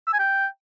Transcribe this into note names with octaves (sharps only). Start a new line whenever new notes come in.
E6
G#5
G5